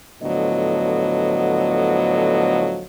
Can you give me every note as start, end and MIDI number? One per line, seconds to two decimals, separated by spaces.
0.22 2.83 45
0.22 2.83 50
0.22 2.83 53
0.22 2.83 54
0.22 2.83 59
0.22 2.83 75